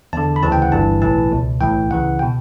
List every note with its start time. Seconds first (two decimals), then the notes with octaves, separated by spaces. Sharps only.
0.13 E2 D3 A5
0.36 B5
0.43 D2 C#3 E3 A5
0.52 G5
0.62 F#5
0.72 G1 G2 E3 A5
1.02 B1 A2 E3 A5
1.32 C#2 B2
1.61 B1 A2 E3 G5
1.90 C#2 C#3 E3 F#5
2.19 G5
2.22 B2